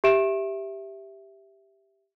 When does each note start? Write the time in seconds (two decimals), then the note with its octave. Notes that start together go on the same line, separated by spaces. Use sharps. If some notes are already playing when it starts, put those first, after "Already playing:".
0.04 G4 E5 D7 E7